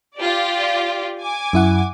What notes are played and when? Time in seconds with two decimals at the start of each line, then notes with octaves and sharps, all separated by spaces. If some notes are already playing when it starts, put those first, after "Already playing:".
0.16 F4 G4 D5
1.18 G#5 D6
1.53 F#2 E4 F#5